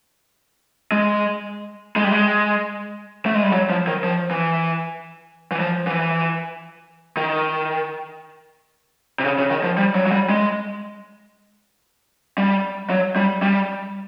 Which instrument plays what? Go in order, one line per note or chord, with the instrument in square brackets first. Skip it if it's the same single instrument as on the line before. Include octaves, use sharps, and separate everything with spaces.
[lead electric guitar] G#3
G#3
G3
G#3
A3
G#3
G3
F#3
F3
D#3
F3
E3
E3
F3
E3
D#3
C3
C#3
C#3
D#3
F3
G3
F#3
F#3
G3
G#3
G3
F#3
G3
G3